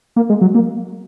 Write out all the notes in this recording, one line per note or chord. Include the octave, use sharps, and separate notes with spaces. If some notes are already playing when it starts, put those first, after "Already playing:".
A#3
G#3
F#3
A#3